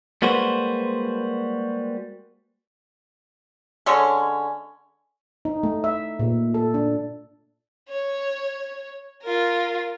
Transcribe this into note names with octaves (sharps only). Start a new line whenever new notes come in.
G3 G#3 A#3 F#4 B4 C5
D3 G#3 C#4
D#4
A3
E5
A#2
A4
D4
C#5
F4 A#4